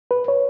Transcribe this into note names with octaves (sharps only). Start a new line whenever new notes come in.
B4
C#5